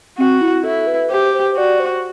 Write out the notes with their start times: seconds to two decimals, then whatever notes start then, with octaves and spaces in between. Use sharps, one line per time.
0.18 C4 F#4
0.41 E4
0.64 E4 A4
0.87 B4
1.10 G4 C5
1.34 C5
1.51 C5
1.57 F#4 D5
1.80 C5